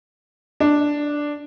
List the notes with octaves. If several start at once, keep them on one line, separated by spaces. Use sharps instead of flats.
D4